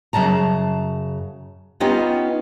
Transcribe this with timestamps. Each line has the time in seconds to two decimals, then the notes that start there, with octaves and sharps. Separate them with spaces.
0.13 F#2 A#2 C#3 A5 A#5
1.80 B3 C#4 D#4 F4 G4